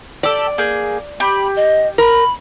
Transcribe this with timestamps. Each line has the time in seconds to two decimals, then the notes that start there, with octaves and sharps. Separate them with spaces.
0.23 G4 A4 D5
0.58 A#3 G#4 G6
1.20 G4 B5
1.56 D#5
1.98 A#4 B5